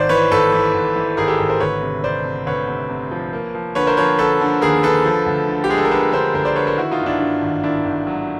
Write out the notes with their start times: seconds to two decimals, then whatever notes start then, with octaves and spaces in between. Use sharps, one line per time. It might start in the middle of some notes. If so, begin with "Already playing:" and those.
Already playing: G#1 C5 D5
0.09 E3 B4 C#5
0.31 G#1 A4 B4
0.52 E3
0.74 G#1
0.96 E3
1.17 G#1 G#4 A#4
1.28 G4 A4
1.39 G#1
1.49 A#4 C5
1.60 D2 B4 C#5
1.82 C3
2.04 C3 C5 D5
2.25 C3
2.46 D2 B4 C#5
2.68 C3
2.89 C3
3.11 F3
3.33 A#3
3.55 F3
3.75 D3 B4 C#5
3.87 A#4 C5
3.97 F3 B4 C#5
4.18 D3 A4 B4
4.41 D3
4.62 D#2 G#4 A#4
4.83 D3 A4 B4
5.05 F3
5.26 D2
5.49 D3
5.64 G4
5.69 G#3 G#4
5.78 A4
5.85 A#4
5.91 D3 A4 B4
6.12 D3 A#4 C5
6.34 D2 A#4 C5
6.45 C5 D5
6.55 D3 B4 C#5
6.67 A#4 C5
6.77 D#3 E4 F#4
6.91 D#4 F4
7.00 G2
7.06 D4 E4
7.20 G2
7.42 G#1
7.63 D#3 D4 E4
7.85 G#1
8.07 F#3